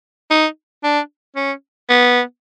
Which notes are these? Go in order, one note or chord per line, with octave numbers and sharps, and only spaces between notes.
D#4
D4
C#4
B3